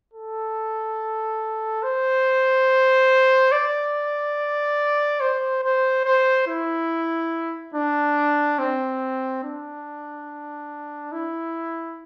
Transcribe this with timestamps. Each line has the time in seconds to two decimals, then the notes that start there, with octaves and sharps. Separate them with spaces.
0.13 A4
1.83 C5
3.52 D5
5.21 C5
5.63 C5
6.05 C5
6.48 E4
7.74 D4
8.59 C4
9.43 D4
11.12 E4